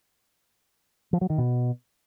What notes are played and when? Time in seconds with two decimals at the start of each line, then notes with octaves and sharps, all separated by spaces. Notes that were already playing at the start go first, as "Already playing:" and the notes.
1.13 F3
1.21 F#3
1.30 D#3
1.38 B2